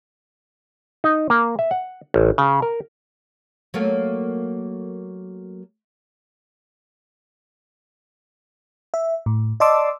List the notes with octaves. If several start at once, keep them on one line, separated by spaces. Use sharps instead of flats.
D#4
A#3
E5
F#5
A1
C#3
A#4
F#3 A3 A#3
E5
A2
D5 D#5 A5 C6 D6 E6